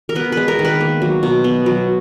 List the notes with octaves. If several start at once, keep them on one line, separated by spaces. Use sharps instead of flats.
A#4
B3 B4
G#3 B4
A#4
D#3
B4
A#3
F#3
B2
B3
F#3